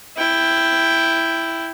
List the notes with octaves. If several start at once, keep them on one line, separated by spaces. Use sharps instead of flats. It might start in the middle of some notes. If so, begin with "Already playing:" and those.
E4 G5